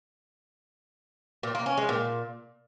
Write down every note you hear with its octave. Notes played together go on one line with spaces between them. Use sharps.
A#2
A#3
C#4
G#3
A#2